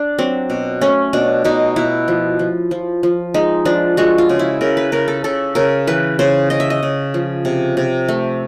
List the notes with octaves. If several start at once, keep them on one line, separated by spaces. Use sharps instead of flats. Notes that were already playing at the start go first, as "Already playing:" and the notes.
Already playing: D4
F#3 C4
B2
A3 C#4
B2 D4
B2 D#4
B2 E4
F3
F3
F3
F3
G#3 D#4
F3 D4
G#3 F#4
F4
C#3
E4
C#3 A#4
B4
C#3 A#4
A4
C#3 A4
C#3 A#4
E3 B4
C#3 C5
C#3 D#5
E5
D#5
C#3
F3
C3
C3
A3